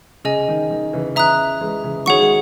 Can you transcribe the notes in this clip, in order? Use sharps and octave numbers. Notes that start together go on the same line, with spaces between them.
C#3 G#4 D#5 G#5
D#3
D#3
C#3 E3
C#3 E3 E5 A#5 D#6 F#6
E3 G#3
C#3 E3
D#3 F#3 G#4 C#5 F#5 C#6
G#3